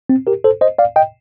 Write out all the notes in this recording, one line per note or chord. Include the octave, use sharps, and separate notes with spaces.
C4
G4 A#4
A4 C5
C5 D#5
D5 F5
D#5 G5